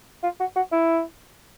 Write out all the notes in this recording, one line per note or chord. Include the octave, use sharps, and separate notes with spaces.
F4
F#4
F#4
E4